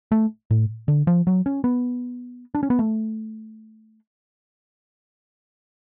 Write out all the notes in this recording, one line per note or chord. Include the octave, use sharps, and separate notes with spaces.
A3
A2
D3
F3
F#3
C#4
B3
D4
C#4
B3
A3